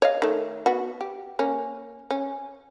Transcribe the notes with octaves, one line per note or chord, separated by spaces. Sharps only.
C#5 D#5 F5
D#3 A3
B3 F#4
G4
A#3 C#4
C#4